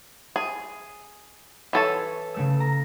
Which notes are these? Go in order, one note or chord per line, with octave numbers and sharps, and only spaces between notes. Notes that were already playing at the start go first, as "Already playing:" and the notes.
G#4
E3 A4 C#5
C#3 A3 E6
A#5